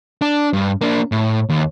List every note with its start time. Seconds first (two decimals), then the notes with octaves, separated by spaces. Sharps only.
0.22 D4
0.53 G2
0.81 A#3 D4
1.12 A2
1.49 D#2